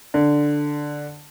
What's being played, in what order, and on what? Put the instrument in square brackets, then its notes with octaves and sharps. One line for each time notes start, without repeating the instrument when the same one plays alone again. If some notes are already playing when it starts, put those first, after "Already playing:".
[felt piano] D3